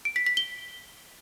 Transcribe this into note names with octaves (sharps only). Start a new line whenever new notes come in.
D7
B6
B6
G7